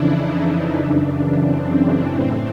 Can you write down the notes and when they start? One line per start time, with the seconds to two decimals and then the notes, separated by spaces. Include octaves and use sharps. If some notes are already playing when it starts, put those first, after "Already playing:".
Already playing: F2 C#3 E3 D4 E4
0.14 D#4
0.77 F#2 C#3 E3 D4
1.41 C4
2.05 A2 E3 C4